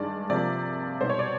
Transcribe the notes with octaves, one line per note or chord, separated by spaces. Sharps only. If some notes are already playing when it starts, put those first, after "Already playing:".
Already playing: G2 D#3 G#3 D5
C3 F3 A#3 D5
B2 G3 B3 D#4 C5
C#5
D5